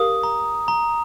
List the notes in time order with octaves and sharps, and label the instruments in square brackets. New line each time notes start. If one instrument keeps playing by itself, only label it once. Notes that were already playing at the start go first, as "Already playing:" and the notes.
Already playing: [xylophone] G4 A#4 F5 [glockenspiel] D#6
[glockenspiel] A#5
A#5